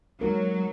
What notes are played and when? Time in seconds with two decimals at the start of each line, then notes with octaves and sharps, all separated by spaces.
0.21 F#3 G#3 D#4 F#4 A#4